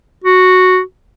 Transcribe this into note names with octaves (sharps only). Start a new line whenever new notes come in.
F#4